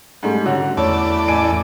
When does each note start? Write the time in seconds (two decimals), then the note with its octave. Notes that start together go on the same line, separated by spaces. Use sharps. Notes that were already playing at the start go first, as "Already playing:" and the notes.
0.23 G#2 G3 A3
0.46 D3 C#4 F#4
0.77 E2 A3 C#5 D5
1.28 A1 G#5 D7